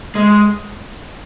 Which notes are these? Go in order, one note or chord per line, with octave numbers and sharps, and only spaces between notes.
G#3